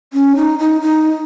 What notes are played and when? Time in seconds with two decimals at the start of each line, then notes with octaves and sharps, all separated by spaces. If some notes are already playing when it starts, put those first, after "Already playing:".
0.13 C#4
0.36 D#4
0.59 D#4
0.81 D#4